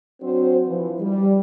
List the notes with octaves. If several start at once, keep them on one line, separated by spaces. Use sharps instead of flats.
F#3 C4 D4 F#4 C5
E3 F3
G3